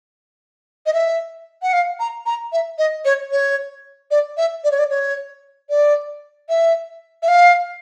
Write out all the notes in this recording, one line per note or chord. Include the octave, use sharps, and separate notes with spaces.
D#5
E5
F#5
F5
A#5
A#5
E5
D#5
C#5
C#5
D5
E5
D5
C#5
D5
C#5
D5
E5
E5
F5